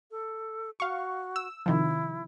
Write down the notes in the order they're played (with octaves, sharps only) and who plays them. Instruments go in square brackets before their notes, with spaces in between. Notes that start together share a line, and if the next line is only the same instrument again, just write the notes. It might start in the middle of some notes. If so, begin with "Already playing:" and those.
[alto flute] A4
[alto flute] F#4 [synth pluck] F5 C#6
[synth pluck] E6
[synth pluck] C3 D#3 F3 [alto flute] E4